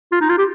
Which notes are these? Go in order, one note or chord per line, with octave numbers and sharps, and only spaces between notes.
F4
D#4
F4
G4